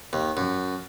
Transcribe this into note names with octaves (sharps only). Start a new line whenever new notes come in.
D#2
F#2